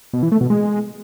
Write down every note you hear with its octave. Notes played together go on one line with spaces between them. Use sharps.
B2
E3
A3
B2
G#3